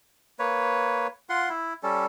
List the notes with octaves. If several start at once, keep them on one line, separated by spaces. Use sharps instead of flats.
A#3 B4 C#5
F4 F#5 C6
E4
G3 C#4 A4